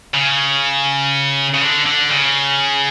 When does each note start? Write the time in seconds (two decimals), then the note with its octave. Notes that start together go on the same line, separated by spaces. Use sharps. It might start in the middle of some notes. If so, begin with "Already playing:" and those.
0.14 C#3
1.54 C#3
1.61 D3
1.86 D3
2.11 C#3